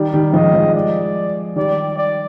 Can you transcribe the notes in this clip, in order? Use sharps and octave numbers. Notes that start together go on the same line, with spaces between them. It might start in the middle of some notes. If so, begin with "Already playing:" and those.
Already playing: D#3 G3 D5
D#3 G3
F3 G#3 D#5
F3 G#3
D5
D#3 G3 D5
D5